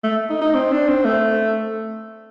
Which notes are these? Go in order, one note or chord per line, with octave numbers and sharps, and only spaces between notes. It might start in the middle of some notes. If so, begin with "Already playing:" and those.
A3
D#4
D#4
C4
D4
C4
A3